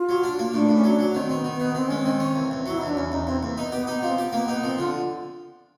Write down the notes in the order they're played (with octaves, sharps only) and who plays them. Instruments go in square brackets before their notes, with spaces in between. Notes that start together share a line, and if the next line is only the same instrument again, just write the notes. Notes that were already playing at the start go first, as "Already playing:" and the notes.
Already playing: [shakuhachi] F4
[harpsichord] F#3
D4
A#3
[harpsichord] A2 [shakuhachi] D4
[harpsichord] A2
[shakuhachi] C#4
[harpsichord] F#3 [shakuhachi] D4
[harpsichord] F#3
[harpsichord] D#3 [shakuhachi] C4
[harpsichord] D#3 [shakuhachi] C4
[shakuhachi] B3
[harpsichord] D#3
[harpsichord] D#3 [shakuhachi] B3
[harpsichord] D#3 [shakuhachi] C4
[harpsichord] G#3 [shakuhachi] C#4
[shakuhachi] C4
[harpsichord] D#3
C#4
E2
E2
[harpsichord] F#3 [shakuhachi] E4
[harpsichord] E2 [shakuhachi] D#4
[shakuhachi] D4
[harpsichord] E2 [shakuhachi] C#4
[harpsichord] E2 [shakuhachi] D#4
[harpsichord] E2 [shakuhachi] C4
[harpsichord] E2 [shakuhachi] A#3
[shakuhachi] B3 [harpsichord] D#4
[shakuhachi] B3 [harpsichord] G4
[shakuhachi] B3 [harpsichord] D#4
[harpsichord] F3 [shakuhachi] C4
[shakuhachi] B3 [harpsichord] G4
[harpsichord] A#3 [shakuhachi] B3
[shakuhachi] B3 [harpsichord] D#4
[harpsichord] F3 [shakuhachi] C4
[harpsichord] D3 [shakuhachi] F4